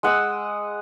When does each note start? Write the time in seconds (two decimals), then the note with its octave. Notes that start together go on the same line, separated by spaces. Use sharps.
0.03 G#3 F#5 D#6 E6